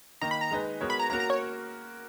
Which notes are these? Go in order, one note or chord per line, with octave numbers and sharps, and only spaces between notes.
D#3 A#3 D#4 A#5
B5
A#5
G#3 D#4 G#4 B4
G#3 B3 F#4 A#4 C#5
B5
A#5
A#3 C#4 F#4 A#4 A#5
A#5
C#5